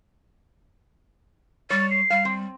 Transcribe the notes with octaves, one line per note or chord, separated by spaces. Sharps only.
G3 C#5 A6
C7
G3 F5
C4